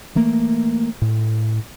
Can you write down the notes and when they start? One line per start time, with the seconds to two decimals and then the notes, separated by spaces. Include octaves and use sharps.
0.15 E3 A3 A#3
1.02 A2